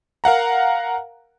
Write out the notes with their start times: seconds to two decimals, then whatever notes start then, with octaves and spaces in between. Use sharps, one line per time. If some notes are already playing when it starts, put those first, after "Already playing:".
0.24 A#4 F5 F#5 A#5